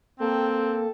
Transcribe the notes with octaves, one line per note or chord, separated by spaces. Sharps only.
A#3 C4 A4 G5